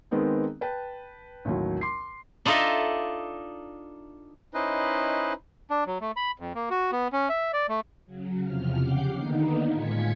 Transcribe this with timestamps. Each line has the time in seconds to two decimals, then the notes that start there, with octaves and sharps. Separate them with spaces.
0.11 D#3 G#3 B3 C4 D#4
0.61 B4 G5 A5
1.45 A1 D#2 F#3
1.81 C6 D6 C7
2.45 D4 D#4 F4 A4 D#5 E5
4.54 C#4 D#4 E4 B4 C5 D#5
5.70 D4
5.87 F#3
6.01 A3
6.16 B5
6.40 F2
6.55 A#3
6.70 F#4
6.92 B3
7.13 C#4
7.29 E5
7.53 D5
7.69 A3
8.06 C#3 F#3
8.42 E2 C3 F3 F6
8.78 C#3 G4 F#5 D6 G6 C7
9.13 D3 D#3 A#3 B3 D#4
9.71 A2 G#3 F4 G#6 B6 C#7